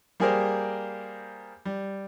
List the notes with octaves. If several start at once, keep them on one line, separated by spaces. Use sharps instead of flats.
G3 A#3 G4 G#4 A#4 C5
G3